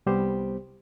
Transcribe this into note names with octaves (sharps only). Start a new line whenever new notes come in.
C2 G3 B3 G4 C5